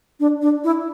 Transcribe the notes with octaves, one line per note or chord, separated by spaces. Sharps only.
D4
D4
E4